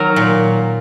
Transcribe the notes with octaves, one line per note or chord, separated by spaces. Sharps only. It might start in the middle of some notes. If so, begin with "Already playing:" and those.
Already playing: D#3 F#3 A#4
A#2